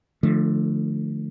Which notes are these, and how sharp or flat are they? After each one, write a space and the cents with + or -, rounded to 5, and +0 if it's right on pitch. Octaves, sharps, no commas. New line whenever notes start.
D3 +30 F3 +0 A3 -5